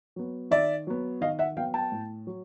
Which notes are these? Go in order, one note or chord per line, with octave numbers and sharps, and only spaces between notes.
F#3 B3
D#3 D5 E5
F#3 B3
D#3 D#5 F5
E5 F#5
F#3 B3 F5 G5
G5 A5
A2
F#3